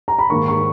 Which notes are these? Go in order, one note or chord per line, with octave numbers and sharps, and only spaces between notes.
A#5
B5
G#2 D#3 A#3 C#6
C#6